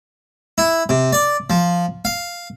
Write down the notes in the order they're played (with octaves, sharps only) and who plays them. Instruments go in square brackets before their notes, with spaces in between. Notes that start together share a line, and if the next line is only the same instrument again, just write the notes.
[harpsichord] E4
C3
D5
F3
F5